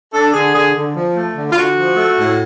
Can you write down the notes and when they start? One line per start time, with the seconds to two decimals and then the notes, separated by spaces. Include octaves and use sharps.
0.14 D4 A4
0.34 D3 G#4
0.54 D3 G#4
0.74 D3
0.95 F3
1.15 A3
1.36 D3
1.50 F4
1.56 D3 F#4
1.76 F3
1.97 A3
2.17 A2